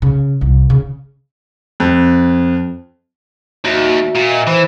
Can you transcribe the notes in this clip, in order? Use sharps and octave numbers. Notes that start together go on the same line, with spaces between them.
C#3
C2
C#3
F2
D#2 F#4 D5 E5
A#2
D#5 E5
E3 C5